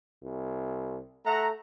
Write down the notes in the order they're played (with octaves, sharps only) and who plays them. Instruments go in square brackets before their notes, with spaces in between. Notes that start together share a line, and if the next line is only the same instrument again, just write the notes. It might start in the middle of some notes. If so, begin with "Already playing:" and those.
[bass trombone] C2
[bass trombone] A3 [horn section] E5 F#5 A#5